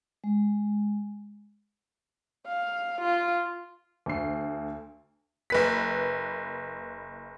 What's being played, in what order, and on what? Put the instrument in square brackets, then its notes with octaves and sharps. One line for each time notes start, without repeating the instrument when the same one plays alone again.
[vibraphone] G#3
[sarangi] F5
F4
[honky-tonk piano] D2 C7
F#1 B4 B6